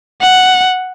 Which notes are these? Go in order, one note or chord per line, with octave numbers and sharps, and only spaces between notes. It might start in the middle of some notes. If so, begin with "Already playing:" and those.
F#5